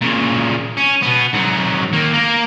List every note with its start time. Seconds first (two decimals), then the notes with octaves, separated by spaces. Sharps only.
0.01 A#2 C#3
0.77 C#4
1.03 B2 B3
1.34 G#2 F#3
1.93 D#3 A#3
2.13 A#3 A#4